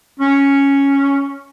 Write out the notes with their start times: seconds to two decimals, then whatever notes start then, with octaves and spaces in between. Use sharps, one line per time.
0.20 C#4